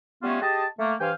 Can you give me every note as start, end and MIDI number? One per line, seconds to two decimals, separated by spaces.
0.23 0.39 55
0.23 0.39 57
0.23 0.39 59
0.23 0.39 61
0.23 0.39 65
0.23 0.39 66
0.42 0.65 67
0.42 0.65 68
0.42 0.65 75
0.42 0.65 81
0.79 0.94 57
0.79 0.94 58
1.00 1.12 43
1.00 1.12 52
1.00 1.12 72
1.00 1.12 77
1.00 1.12 79
1.00 1.12 80